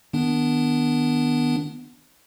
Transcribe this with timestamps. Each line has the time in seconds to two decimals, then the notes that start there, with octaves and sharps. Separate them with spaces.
0.13 D#3 B3 D4